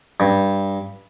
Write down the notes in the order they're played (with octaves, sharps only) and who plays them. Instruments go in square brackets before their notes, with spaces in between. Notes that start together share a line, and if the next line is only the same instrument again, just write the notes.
[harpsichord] G2